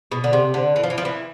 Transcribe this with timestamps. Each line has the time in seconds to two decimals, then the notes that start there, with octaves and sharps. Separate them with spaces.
0.11 B2
0.24 D3
0.33 C3
0.54 D3
0.76 E3
0.84 F3
0.90 E3
0.98 F3
1.05 E3